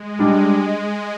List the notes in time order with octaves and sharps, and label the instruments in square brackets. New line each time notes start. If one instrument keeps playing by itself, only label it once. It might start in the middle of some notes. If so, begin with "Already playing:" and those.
Already playing: [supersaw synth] G#3
[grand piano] G3 D4